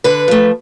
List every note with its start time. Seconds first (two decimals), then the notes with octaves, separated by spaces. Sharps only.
0.04 D3 B4
0.28 F3 A3